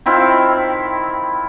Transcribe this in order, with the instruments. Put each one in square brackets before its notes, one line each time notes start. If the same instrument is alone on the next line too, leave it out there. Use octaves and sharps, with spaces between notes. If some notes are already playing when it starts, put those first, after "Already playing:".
[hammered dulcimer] D#3 C4 E4 F4